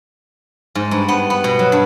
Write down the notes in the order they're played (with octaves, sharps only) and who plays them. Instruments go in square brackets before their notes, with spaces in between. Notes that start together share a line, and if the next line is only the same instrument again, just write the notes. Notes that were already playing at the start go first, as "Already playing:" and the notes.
[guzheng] G#2
G2
B3
B3
B2
F#3
G2